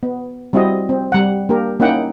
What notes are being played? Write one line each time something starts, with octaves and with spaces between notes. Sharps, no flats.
B3
G3 C4 E4 F#4 D#5
C4
G3 F#5
A#3 D4 G4 A#4
A#3 C#4 D#4 E4 F#5 G5